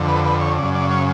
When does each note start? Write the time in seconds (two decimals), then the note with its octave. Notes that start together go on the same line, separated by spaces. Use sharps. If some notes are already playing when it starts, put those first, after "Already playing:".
Already playing: F2 D3
0.08 B4
0.25 B4
0.41 C#5
0.58 F#2 C#3 D5
0.75 D5
0.91 C#5